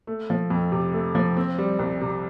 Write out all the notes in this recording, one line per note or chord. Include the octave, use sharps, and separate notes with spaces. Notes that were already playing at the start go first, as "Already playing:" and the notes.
A3
F3
F2
C3
A3
F3
C4
G3
C2
C3